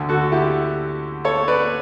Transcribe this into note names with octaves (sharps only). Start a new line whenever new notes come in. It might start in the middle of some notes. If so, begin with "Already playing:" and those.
Already playing: D2 D3
F#4 A4
E4 G4
A4 C#5
B4 D5